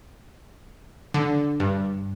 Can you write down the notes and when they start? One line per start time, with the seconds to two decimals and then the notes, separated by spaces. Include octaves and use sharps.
1.14 D3
1.60 G2